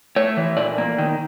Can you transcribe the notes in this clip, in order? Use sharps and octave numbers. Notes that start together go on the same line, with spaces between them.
A3 C#5
E3
A#2 D5
A#3
D#3